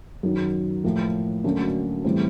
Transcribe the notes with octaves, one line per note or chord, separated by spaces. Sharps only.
F#2 D#3 F#3
A2 F3 A#3
D2 D3 F#3 A#3 C#4
A2 E3 G3 C4